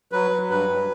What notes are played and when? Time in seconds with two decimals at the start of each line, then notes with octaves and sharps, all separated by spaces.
0.12 F#3 B4
0.31 F#3
0.50 G2 B4
0.69 G2